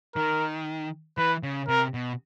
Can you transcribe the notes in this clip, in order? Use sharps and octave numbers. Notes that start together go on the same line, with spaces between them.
D#3 A#4
E3 B4
C#3
C3 A#4
B2